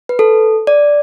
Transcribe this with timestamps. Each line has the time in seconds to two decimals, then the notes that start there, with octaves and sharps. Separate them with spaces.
0.09 B4
0.19 A4
0.67 D5